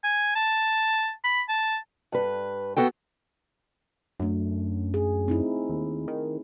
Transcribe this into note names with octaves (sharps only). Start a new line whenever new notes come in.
G#5
A5
B5
A5
G2 B4
B3 F#4 A4 G5
F#2 A3 D4
G#4
C4 D#4 E4
D#2
D#3